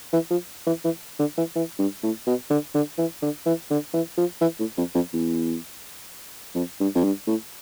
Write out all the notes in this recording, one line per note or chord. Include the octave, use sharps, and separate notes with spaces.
E3
F3
E3
E3
D3
E3
E3
G2
A2
B2
D3
D3
E3
D3
E3
D3
E3
F3
E3
A2
F2
F2
E2
F2
G2
F2
G2
A2